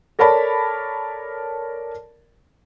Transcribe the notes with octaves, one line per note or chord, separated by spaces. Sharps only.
A4 A#4 C#5 D5 A5 B5